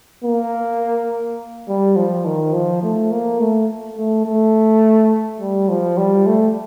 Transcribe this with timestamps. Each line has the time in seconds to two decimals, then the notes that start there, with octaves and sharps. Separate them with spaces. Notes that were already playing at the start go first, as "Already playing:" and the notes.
0.24 A#3
1.68 G3
1.96 F3
2.25 D#3
2.53 F3
2.83 A3
3.11 A#3
3.40 A3
3.97 A3
4.26 A3
5.40 G3
5.69 F3
5.97 G3
6.26 A3